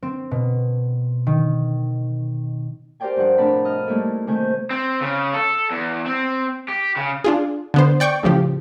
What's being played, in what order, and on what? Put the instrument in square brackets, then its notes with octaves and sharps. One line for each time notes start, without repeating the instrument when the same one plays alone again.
[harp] C4
B2
D#3
G4 A#4 C5 D5 G5 G#5
G2 F3 F#5
A2 C3 D4 A#4 A5 B5
D#5 F6
G3 A3 A#3 D#4 E4 A4
C3 D#3 A3 G#5 G6
[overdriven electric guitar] C4
C#3
A4
E2
C4
G4
C#3
[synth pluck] D4 F4 G#4
D3 B3 C5
D5 G5 C#6 D6 G6
A2 C#3 F3 G4